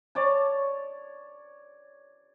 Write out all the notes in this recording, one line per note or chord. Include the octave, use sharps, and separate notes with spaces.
C#5 D5 A5